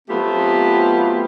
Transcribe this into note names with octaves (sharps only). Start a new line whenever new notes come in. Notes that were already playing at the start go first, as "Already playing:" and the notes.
F#3 A3 B3 C4 F4 G4